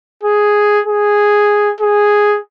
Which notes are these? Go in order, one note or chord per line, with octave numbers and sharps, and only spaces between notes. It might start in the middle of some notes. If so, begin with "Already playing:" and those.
G#4
G#4
G#4